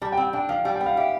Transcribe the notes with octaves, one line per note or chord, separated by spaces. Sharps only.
G3 A5
G5
C4
G5
D4 G5
F3 F5
G3 G5
G5
B3
F5
G4 E5